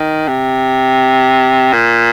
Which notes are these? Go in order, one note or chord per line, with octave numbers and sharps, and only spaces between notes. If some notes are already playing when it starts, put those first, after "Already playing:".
Already playing: D#3
C3
A#2